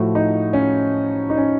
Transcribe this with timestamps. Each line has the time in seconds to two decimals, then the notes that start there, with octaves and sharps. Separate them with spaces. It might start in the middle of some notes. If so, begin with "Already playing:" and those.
Already playing: A2 F3 A3 F#4
0.15 D#4
0.53 C#4
1.30 D#4
1.37 C#4